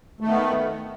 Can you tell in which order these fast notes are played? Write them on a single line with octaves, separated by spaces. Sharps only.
A3 D#3 B3